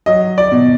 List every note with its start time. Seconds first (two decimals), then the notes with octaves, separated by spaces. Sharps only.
0.06 F#3 D#5
0.38 D5
0.52 B2